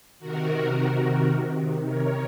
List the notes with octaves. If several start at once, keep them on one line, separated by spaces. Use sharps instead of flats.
C3 D#3 F#4 A#4
C3 D#3
A#4 C#5